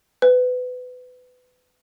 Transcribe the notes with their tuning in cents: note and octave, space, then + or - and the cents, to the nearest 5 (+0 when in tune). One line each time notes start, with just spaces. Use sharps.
B4 +25